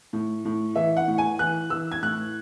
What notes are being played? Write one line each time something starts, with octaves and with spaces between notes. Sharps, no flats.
A2
A2
E3 E5
F#5
A2
G#5
E3 F#6
E3 E6
G#6
A2 F#6